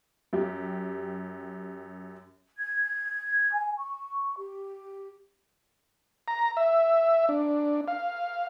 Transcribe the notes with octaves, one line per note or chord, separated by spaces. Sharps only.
F#2 G4
G#6
G#5
C#6
G4
A#5
E5
D4
F5